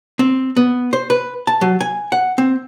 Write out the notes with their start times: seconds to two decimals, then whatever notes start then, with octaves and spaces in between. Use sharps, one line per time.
0.19 C4
0.57 B3
0.93 C5
1.10 B4
1.47 A5
1.61 F#3
1.81 G#5
2.12 F#5
2.38 C4